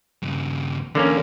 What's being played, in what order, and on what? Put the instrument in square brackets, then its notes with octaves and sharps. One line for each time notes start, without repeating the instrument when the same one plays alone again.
[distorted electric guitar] G2 C#3
[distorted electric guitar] E2 [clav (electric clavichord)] D3 A#3 C#4